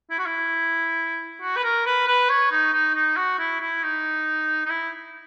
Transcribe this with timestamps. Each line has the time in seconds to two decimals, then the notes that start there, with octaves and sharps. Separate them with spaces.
0.10 E4
0.19 F#4
0.26 E4
1.42 F#4
1.57 B4
1.64 A#4
1.86 B4
2.08 B4
2.29 C#5
2.51 D#4
2.73 D#4
2.95 D#4
3.17 F#4
3.39 E4
3.60 E4
3.83 D#4
4.66 D#4
4.70 E4